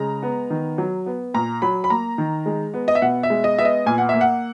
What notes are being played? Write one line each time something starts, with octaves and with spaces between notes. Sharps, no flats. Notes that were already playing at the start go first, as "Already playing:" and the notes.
Already playing: C#3 G#3 A#5
B3
D#3
F#3
B3
A#2 A#5
F#3 B5
B5
A#3 A#5
D#3
G#3
B3
D#5
E5
B2 F#5
E5
G#3
D#5
B3 E5
D#5
A#2 G#5
F#5
A#3 E5
F#5